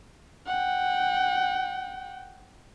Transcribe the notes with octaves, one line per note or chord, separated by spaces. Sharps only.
F#5 G5